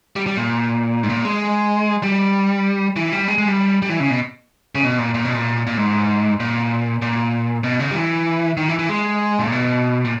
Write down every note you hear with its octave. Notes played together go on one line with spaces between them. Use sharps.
G3
G3
A#2
G#2
A#2
G#3
G3
E3
G3
G#3
G#3
G3
G3
E3
C#3
B2
C#3
B2
A#2
A#2
B2
A#2
A#2
G#2
A#2
A#2
B2
C#3
G3
E3
D#3
E3
E3
G#3
A#2
B2
A#2